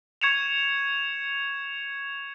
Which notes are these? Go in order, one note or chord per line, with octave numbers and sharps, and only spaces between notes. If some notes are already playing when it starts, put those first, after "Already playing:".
C#6 G#6 C#7 E7 F7